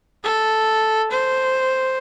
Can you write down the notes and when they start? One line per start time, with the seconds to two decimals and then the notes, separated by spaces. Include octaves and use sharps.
0.24 A4
1.11 C5